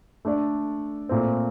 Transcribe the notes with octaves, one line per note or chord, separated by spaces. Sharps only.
A3 D4 A4 D5
A#2 A3 C4